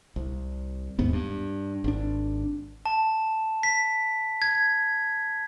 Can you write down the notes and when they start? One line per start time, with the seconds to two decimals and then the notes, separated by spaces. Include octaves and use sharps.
0.16 C2
0.99 D#2 G#2 B3
1.13 G2
1.84 G#1 D4
2.86 A5
3.63 B6
4.42 G#6